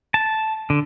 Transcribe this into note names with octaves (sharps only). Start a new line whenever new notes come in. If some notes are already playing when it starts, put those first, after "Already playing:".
A5
D3